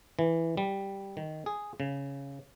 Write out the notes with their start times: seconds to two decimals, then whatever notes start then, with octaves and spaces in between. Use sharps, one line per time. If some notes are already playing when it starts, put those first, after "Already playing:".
0.19 E3
0.57 G3
1.17 D#3
1.46 G#4
1.80 C#3